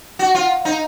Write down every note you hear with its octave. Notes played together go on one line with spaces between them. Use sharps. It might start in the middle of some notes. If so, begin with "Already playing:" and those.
F#4
F4
D#4